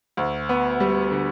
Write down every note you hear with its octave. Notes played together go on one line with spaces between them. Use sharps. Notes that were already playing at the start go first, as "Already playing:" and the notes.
D2
B3
G3
D3